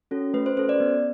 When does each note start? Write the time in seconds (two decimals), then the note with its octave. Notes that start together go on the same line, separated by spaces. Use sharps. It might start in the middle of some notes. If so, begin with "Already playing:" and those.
0.11 C#4 F#4 A4
0.34 A3 B4
0.46 C5
0.57 C#4 F#4 A4 C5
0.69 D5
0.80 B3